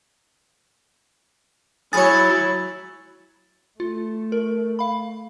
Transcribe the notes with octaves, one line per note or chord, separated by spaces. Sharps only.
F#3 E4 G#4 C#5 B5 A6
A3 F4
A#4
F5 B5